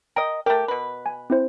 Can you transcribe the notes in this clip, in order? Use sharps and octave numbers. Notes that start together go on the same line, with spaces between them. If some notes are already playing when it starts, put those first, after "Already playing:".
A#4 D#5 G5
A3 G4 A#4
B2 B4
G#5
C4 E4 C5